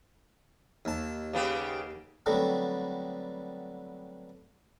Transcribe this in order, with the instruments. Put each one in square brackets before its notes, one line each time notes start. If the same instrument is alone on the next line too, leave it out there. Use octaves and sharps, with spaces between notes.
[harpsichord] D#2 A5
[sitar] C#3 B3 G4
[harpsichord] D3 F#3 G3 A3 B3 C4